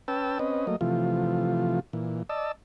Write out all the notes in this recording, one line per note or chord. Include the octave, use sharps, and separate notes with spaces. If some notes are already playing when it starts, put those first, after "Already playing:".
C#4 B4 G5 A5 E6
C4 C#4 B4 D#5
F#3 A3 A#3 D#5
C3 E3 F3 A3 F4
A#2 E3
D5 D#5 A5 E6